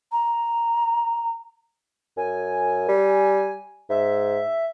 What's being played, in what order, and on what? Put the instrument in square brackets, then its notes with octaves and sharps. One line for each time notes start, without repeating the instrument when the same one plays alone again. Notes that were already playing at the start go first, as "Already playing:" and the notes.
[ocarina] A#5
[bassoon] F#2 [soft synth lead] G#5
[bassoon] G3
[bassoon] G#2 [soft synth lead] E5